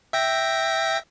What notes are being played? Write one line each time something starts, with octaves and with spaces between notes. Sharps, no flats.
E5 G5 A#6